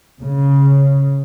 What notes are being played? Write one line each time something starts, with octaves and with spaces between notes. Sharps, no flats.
C#3